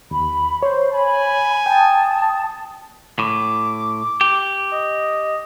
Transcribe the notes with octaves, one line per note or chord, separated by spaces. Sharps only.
D#2 B5
C5 C#5
G#5 B5
G5 A5 D#6
A2 D6
G4
D#5